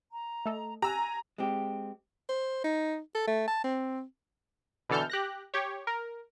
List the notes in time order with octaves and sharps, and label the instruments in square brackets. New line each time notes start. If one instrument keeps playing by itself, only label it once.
[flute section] A#5
[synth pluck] A3 A4 D#5
[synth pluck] G4 E6 F#6 [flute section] G#5 [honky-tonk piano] A#5
[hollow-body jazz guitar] G#3 C4 G4
[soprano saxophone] C5
D#4
A4
A3
A5
C4
[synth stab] B2 D3 E3 A4 F6 G6
G4 F#6 A#6
G4 C#5
A#4